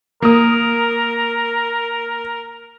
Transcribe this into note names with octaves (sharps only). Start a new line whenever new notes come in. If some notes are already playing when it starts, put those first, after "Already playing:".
A#3 A#4 D#6